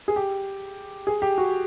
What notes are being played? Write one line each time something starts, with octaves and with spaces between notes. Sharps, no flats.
G#4
G4
G#4
G4
F#4